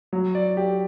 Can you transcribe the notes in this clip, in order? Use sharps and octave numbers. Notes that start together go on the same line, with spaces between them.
F#3
D5
G4